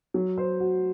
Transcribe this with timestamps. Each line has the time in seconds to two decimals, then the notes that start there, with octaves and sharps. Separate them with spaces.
0.14 F#3
0.38 C5
0.60 F#4